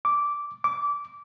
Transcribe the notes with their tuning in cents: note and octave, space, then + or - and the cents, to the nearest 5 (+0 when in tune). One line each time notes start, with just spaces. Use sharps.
D6 -10
D6 -20